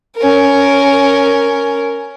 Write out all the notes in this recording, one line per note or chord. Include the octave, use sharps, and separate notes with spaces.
C#4 A#4